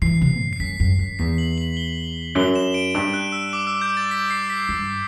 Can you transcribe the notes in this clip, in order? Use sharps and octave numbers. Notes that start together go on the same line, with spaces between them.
E3 C7
C3
F#2
C7
F#2 B6
F#2
F#2
E2 B6
F#7
F#7
G7
F#2 G7
E7
D7
G2 D7
F#6
E6
D6
E6
G6
A6
B6
C7
B6
G2